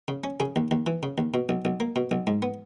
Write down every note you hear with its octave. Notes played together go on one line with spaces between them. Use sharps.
C#3
C#4
C#3 G#4
D#2
D#2
E3
C#3
D#2
B2
B1
B1
A#3
B2
B1
G#2
B3